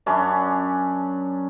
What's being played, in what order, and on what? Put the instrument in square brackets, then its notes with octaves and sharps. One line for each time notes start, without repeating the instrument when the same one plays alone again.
[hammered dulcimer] F#2 C#4 D4